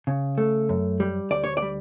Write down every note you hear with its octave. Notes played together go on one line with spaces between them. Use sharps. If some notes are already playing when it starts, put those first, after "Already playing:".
C#3
A3
F#2
G3
D2 D5
C#5
D5
G3